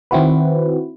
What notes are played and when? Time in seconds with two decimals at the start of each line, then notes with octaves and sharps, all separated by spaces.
0.11 D#3 C4 E4 F#4 B4